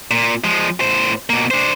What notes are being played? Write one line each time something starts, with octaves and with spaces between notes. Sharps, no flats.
A#2
F3 G#3
A2 C5
B2 A#3
D4 C5